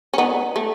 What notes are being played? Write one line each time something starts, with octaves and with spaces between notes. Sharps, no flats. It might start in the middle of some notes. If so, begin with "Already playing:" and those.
C#4
B3 D#4
A3